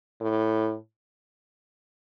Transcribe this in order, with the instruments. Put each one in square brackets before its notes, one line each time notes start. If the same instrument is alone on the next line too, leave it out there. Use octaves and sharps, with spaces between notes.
[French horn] A2